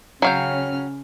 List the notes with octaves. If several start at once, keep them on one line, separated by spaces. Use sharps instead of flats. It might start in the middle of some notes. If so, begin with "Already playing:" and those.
C#3 F#3 C#4 F5 G5 F6